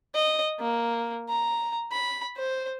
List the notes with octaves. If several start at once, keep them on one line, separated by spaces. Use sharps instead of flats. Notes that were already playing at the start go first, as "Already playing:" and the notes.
D#5
A#3
A#5
B5
C5